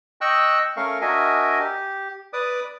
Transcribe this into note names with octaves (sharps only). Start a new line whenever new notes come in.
D#5 G5 C#6 E6 F#6
A3 C#4 A#4 F5 C#6
D4 F#4 A#4 D#5 E5 G#5
G4
B4 D5 D6 D#6